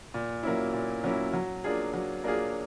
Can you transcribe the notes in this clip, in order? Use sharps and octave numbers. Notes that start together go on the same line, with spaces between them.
A#2
F#3 A#3 C#4 E4
A#2
F#3 A#3 C#4 E4
F#3
A#3 D4 F4 G#4
F#3
A#3 D4 F4 G#4